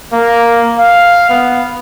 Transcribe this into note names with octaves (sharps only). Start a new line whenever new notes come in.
A#3
F5
B3